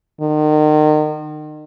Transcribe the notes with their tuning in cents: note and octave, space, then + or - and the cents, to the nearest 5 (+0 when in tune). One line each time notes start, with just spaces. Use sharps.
D#3 -35